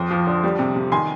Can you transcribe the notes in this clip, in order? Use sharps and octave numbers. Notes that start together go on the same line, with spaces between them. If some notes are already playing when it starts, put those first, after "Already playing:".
Already playing: F2 C6 D#6
F3
D3
G3
C3
C3
D#3 G#5 C6